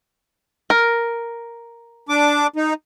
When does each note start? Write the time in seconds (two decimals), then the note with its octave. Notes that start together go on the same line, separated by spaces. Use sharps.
0.70 A#4
2.09 D4 D6
2.56 D#4